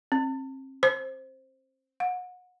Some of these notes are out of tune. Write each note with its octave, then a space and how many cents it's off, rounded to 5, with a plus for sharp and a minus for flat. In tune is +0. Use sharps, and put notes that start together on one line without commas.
C4 +35
C5 +10
F#5 -30